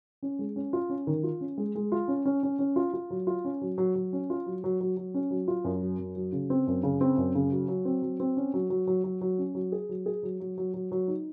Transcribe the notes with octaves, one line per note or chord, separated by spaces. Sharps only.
C#4
G#3
C#4
F4
C#4
D#3
F4
C#4
G#3
G#3
F4
C#4
C#4
C#4
C#4
F4
F4
F#3
F4
C#4
F#3
F#3
F#3
C#4
F4
F#3
F#3
F#3
F#3
C#4
F#3
F4
F#2
F#3
F#2
F#3
C#3
C4
F#2
C#3
C4
F#2
C#3
F#3
F#3
C4
F#3
C4
C#4
F#3
F#3
F#3
F#3
F#3
C#4
F#3
G#4
F#3
G#4
F#3
F#3
F#3
F#3
F#3
D#4